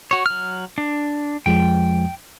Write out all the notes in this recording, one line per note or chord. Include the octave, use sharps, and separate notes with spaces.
F#4 C#5
F#3 F6
D4
F2 F3 G#3 G5